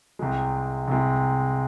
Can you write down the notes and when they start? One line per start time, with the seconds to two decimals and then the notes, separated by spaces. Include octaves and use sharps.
0.19 C2 C3 G#3
0.88 C2 C3 G#3